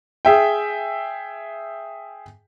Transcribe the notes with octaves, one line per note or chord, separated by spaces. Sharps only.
G#4 E5 G5